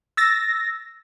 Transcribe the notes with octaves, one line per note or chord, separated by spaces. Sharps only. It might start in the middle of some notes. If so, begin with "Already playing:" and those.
E6 A6 A#6